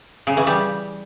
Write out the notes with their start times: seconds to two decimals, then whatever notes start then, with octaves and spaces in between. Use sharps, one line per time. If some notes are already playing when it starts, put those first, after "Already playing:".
0.27 C#3
0.37 E3
0.47 G3